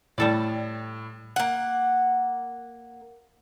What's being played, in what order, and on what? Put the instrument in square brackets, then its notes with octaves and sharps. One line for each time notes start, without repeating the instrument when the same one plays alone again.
[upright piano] A2 [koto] G3 A4 D5
[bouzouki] A#3 F#5